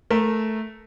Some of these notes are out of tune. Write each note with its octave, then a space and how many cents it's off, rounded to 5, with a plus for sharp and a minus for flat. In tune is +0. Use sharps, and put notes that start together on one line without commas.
A3 -10 A#4 +0